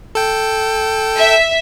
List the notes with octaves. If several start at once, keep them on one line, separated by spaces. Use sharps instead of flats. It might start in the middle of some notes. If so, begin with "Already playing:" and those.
A4 G5
E5